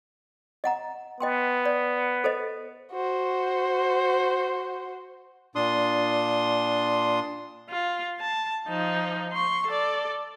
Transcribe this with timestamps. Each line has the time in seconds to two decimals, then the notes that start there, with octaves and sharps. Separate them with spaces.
0.64 D#5 F#5 A#5
1.20 B3 D#5 G5 C6
1.65 D5
2.24 A4 C5 D#5
2.93 F#4 C5
5.55 A#2 D4 C6 D#6
7.70 F4
8.20 A5
8.68 F3 D#4
9.32 C6 C#6
9.67 A4 D5